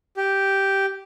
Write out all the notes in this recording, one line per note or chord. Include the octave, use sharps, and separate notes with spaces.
G4